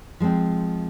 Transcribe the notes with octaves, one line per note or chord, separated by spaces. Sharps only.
F3 G#3 C4